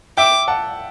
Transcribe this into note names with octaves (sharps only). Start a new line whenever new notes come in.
E5 G5 D6
F#5 A5